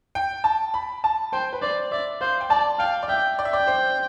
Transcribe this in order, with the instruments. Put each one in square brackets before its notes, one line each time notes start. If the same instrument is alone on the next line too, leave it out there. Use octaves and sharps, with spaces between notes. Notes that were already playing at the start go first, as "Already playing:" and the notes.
[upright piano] G5
A5
B5
A5
[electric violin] C5 [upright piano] G5
[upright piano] B4
[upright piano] C5 [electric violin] D5
[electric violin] D5 [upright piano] E5
[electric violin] C5 [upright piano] F5
[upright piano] G5
[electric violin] D5 [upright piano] A5
[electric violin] F5 [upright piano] G5
[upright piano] D5
[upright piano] E5 [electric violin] G5
[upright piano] D5
E5
[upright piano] D5 [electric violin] G5
[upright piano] C5